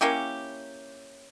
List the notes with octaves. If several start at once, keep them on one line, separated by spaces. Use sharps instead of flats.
A#3 C#4 E4 G4